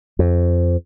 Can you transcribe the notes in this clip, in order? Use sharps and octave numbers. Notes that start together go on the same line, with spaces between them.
F2